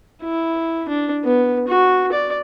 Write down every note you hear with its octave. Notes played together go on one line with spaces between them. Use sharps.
E4
D4
B3
F#4
D5